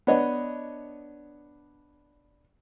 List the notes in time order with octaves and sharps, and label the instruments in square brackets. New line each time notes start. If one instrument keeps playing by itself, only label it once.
[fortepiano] B3 D4 C#5 D#5